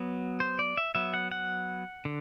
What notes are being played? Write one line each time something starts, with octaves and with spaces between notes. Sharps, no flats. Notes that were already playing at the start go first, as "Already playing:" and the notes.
Already playing: F#3 B3 F#4
C5
D5
E5
F#3 B3 E5
F#5
F#5
D3